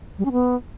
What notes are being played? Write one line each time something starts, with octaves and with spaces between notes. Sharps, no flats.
G3
C#4
B3